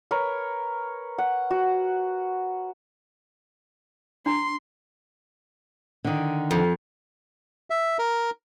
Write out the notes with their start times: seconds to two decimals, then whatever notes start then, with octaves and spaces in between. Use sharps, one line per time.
0.11 A#4 B4 C#5
1.18 F#5
1.51 F#4
4.26 D4 A#5 C6
6.04 D3 D#3
6.51 F2
7.70 E5
7.99 A#4